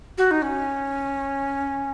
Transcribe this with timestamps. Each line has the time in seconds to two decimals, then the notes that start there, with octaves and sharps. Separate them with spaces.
0.17 F#4
0.31 D#4
0.42 C#4